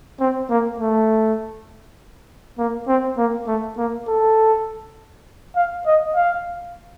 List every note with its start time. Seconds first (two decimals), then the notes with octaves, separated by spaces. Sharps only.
0.20 C4
0.50 A#3
0.80 A3
2.58 A#3
2.88 C4
3.17 A#3
3.47 A3
3.78 A#3
4.08 A4
5.56 F5
5.86 D#5
6.15 F5